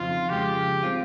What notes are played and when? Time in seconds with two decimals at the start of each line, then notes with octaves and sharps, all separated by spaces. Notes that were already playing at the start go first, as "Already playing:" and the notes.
Already playing: F2 C#3 F3 C4 D#4 F4
0.30 C#3 F3 G#3 G4
0.83 G3 C4 F4